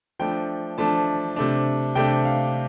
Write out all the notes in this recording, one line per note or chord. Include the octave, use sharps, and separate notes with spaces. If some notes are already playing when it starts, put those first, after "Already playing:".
F3 A3 D4 G5
F3 A3 D4 A5
C3 A3 D4
C3 A3 D4 G5
F5